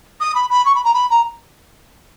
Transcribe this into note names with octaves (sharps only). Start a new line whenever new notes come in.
D#6
B5
B5
C#6
B5
A#5
B5
A#5